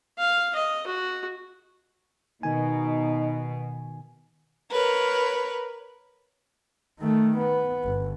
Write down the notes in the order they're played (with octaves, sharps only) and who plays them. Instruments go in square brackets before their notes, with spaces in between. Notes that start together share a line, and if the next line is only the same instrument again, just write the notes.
[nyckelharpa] F5
D#5
F#4
[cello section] B2 [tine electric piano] D#3 G#5 [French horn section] D#4
[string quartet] A#4 B4 C#5
[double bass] D#3 A3
B3
G1